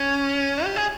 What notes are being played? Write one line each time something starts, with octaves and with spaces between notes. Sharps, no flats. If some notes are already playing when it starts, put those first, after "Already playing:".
Already playing: C#4
G4
G#4